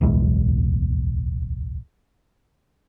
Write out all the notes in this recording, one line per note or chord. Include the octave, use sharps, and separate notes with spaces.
D1 B1 E2 G#3